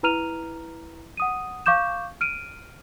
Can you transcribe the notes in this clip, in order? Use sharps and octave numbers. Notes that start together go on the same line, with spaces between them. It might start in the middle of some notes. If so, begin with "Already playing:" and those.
E4 B4 A#5 F6 D#7 F7
F#5 D#6 D#7
F5 C#6 D6 G6 E7
F6 D7 D#7